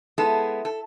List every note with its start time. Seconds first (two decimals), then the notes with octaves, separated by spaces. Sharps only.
0.18 G#3 B3 E4 A4
0.65 A4